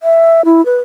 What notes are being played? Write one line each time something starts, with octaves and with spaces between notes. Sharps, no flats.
E5
E4
B4